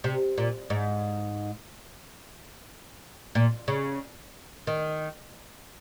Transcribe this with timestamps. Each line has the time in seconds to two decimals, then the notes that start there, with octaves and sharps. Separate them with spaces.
0.04 C3
0.38 A#2
0.70 G#2
3.35 A#2
3.68 C#3
4.67 D#3